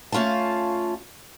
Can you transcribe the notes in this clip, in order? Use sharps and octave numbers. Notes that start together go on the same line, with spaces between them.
A3 C#4 F4 F5 A5